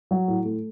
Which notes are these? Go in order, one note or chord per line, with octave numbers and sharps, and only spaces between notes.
F#3
A2
A3